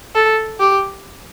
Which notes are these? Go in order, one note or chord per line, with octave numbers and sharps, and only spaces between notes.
A4
G4